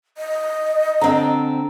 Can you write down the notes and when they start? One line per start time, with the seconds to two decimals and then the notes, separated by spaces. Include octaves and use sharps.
0.18 D#5
1.01 D3 C4 A#5